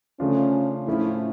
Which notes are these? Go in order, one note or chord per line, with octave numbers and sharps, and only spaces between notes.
C#3 F3 A3 C#4 D4 F4
A2 F3 A3 C#4 E4